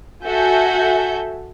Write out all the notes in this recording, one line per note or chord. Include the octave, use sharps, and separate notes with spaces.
F#4 A4 E5 G#5 G6